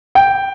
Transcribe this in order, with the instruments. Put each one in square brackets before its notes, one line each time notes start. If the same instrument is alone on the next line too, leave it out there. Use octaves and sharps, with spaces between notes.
[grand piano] G5